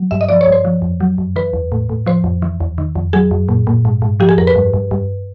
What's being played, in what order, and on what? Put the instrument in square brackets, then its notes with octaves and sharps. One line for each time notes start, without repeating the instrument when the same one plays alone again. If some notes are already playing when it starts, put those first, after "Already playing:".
Already playing: [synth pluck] F#3
G2 E5
D#5
F3 D5
C#5
G2 C5
F3
F2
F#3
F#2
E3 B4
E2
A2
A2
F3 C5
F2
E3
E2
D#3
F2
F#3 G#4
F#2
A#2
A#2
G#2
G#2
F3 G4
G#4
F2 A#4
B4
G2
G2
G2